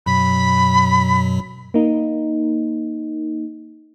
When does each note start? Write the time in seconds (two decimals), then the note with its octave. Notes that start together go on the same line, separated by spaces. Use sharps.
0.06 F#2 B2 F#3 B5
1.74 A#3 D#4